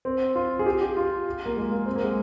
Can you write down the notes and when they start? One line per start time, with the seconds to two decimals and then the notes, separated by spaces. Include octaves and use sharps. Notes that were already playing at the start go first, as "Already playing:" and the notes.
0.05 C4
0.35 F4
0.59 G#4
0.66 G4
0.81 G4
0.97 F4
1.46 A#3
1.57 G#3
1.71 A#3
1.86 C4
1.95 A#3
2.04 G#3